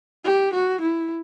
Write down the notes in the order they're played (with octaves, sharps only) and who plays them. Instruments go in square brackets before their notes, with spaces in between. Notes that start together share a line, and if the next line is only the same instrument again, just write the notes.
[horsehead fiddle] G4
F#4
E4